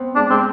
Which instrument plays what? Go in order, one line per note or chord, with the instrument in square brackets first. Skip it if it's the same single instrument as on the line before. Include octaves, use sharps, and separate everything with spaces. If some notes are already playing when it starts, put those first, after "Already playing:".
Already playing: [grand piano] B3 C4
[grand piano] G#3 [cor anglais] D4
[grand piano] G#3 [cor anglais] C4